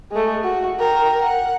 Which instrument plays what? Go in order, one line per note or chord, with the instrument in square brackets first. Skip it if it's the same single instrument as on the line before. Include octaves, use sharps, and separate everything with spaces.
[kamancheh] G#3 A3
F#4
A#4 G5
F#5